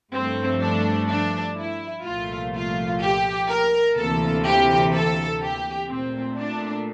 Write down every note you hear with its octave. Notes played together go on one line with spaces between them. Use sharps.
G2 F3 A3 C4
D4
D4
E4
C2 A#2 F3 A3 F4
F4
G4
A#4
D2 C3 E3 A#3 A4
G4
A4
G4
A#2 A3 C4
D4